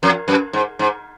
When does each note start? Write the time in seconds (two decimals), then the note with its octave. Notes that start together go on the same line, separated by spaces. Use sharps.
0.03 F2
0.28 F#2
0.53 G#2
0.79 G#2